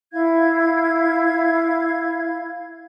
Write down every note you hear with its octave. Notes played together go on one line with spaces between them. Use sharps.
E4 F5 G#6